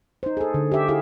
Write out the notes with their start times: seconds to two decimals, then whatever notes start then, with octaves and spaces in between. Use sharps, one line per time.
0.23 D#4 C5
0.37 G#4 A4
0.54 D3
0.72 G4 E5
0.88 E4 G4 G#4 F5